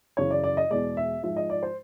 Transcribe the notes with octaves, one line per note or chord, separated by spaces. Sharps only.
F#2 C#3 E3 C#5
D5
D5
D#5
E2 B2 G#3 D5
E5
G#2 F3 G#3 E5
D#5
D5
C5